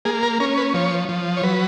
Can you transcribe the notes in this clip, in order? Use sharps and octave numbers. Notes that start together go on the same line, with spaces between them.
A#3 G#4
A#4
C#4 A#4
B4
F3 C#5
F3
C#5
F#3 B4